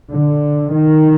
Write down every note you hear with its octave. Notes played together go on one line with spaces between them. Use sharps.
D3
D#3